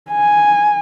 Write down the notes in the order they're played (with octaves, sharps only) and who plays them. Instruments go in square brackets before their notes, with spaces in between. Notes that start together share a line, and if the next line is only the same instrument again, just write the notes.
[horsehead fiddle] G#5